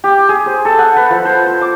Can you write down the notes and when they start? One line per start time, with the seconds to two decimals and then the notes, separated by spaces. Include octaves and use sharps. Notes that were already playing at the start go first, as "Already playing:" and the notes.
0.04 G4
0.29 G#4
0.46 C5
0.65 A4
0.79 F#5
0.96 B4
1.10 F3
1.25 C5
1.46 C5
1.61 D6